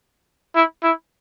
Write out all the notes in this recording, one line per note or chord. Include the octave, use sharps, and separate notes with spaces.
E4
E4